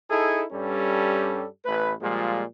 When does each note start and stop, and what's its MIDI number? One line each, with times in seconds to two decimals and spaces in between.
0.10 0.44 63
0.10 0.44 64
0.10 0.44 68
0.10 0.44 69
0.52 1.46 43
0.52 1.46 55
0.52 1.46 61
0.52 1.46 67
0.52 1.46 69
1.65 1.93 33
1.65 1.93 57
1.65 1.93 71
2.02 2.43 46
2.02 2.43 53
2.02 2.43 55
2.02 2.43 56